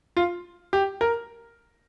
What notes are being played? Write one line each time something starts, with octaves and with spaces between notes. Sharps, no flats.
F4
G4
A#4